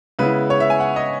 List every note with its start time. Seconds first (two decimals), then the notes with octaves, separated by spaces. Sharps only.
0.19 C#3 G#3 B3 E4 B4
0.50 C#5
0.60 E5
0.70 G#5
0.80 F#5
0.96 D#5